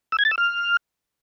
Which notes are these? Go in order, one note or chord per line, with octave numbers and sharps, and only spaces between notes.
E6
G#6
A6
E6
F6